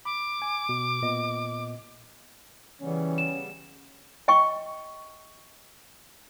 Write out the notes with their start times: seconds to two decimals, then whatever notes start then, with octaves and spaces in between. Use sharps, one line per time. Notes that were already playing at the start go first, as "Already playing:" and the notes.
0.05 B5 D6
0.42 G#5
0.69 B2
1.02 A#2 B3 D#5
2.81 C#3 E3 G3 B3 C#4
3.18 E7
4.28 D#5 G5 C#6